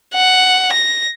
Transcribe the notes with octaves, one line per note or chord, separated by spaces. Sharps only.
F#5
A#6